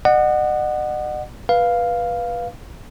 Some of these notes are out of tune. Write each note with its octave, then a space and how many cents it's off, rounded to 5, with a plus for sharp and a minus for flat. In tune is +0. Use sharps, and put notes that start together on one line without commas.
D#5 -45 F#5 +0
B4 -15 F5 +0